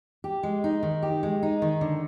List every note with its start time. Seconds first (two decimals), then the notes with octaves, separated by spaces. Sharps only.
0.24 G4
0.43 G#3
0.64 D#4
0.83 D#3
1.03 G4
1.23 G#3
1.43 D#4
1.62 D#3
1.81 D3